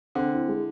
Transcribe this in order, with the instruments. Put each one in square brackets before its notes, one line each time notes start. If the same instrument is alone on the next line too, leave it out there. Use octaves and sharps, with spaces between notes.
[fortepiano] D3 [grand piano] C4
[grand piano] E4
G#3